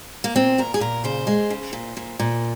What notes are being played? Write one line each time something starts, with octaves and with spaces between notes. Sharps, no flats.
A#3
A#2 C4
A#2 A#4
G#4
A#2 A#4
C#3 C5
G#3
C#3
A#2
A#2
A#2